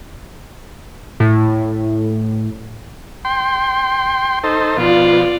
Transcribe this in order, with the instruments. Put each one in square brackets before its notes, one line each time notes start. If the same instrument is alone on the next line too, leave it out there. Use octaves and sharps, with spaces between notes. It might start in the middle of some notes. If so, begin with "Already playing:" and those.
[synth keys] A2
[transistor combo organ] G5 C6
D#4 A4 C5
[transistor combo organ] B2 F3 [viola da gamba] F4 D5